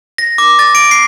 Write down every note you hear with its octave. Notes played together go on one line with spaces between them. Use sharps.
A#6
D6
A6
D7
C7